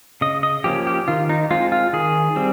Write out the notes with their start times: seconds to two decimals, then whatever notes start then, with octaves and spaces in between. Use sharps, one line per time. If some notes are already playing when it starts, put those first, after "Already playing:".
0.21 C#3 D#5
0.43 D#5
0.64 F3 A#3 C#4 G4
0.87 G4
1.08 D#3 F4
1.29 D#4
1.50 G#3 C4 F4
1.72 F4
1.93 D#3 G#4
2.36 G3 C4